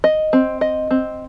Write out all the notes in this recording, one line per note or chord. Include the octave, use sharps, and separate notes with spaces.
D#5
C4
D#5
C4